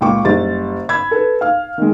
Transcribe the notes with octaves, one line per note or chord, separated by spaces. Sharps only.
C#2 A#2 G5 C#6 D6
F#1 G3 A6
B5 E6 G#6
A4 B4
F5 F6
D#3 G#3